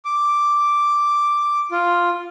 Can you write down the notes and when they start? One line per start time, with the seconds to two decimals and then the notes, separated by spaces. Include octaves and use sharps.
0.05 D6
1.71 F4